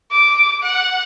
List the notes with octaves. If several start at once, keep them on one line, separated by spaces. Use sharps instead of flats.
D6
F#5